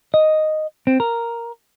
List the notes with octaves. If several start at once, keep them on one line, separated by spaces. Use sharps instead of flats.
D#5
C4
A#4